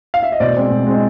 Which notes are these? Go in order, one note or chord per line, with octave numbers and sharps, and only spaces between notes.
F5
E5
D#5
B2 C5 D5
G#3 C4
B2
G#3 C4